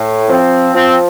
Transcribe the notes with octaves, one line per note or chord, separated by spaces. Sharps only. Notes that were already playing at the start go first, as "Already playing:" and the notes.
Already playing: A2
F3 C4
F3 C4